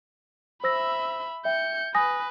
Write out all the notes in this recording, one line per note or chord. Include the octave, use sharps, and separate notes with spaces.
C5 E5 B5 E6 A#6
E5 G5 G6 C#7
B4 G#5 D#6 A#6